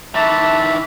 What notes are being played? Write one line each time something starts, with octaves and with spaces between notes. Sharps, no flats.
D#3 E3 E5 A5